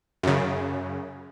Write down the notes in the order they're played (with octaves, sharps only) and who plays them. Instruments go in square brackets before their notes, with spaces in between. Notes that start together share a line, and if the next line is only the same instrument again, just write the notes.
[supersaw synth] F#2 C#3